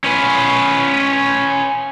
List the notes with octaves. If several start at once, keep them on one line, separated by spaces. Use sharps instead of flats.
C#4 B4